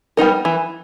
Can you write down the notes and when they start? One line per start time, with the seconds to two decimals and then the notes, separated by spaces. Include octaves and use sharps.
0.17 G3 B3 D#4 A#4
0.45 E3